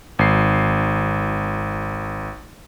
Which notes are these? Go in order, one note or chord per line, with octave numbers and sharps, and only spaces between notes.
G#1 C7